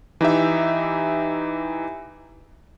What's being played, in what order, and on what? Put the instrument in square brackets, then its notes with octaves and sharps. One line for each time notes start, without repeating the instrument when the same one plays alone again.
[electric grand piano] E3 D#4 G4 E5